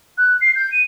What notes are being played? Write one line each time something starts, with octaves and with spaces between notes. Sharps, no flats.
F#6
C7
G6
D#7